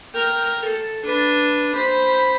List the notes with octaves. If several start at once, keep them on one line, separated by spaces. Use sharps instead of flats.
A#4 G5
A4
D4 B4
C5 B5